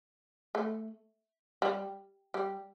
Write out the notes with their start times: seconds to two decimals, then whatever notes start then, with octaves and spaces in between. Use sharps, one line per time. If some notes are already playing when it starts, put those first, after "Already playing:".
0.55 A3
1.62 G3
2.34 G3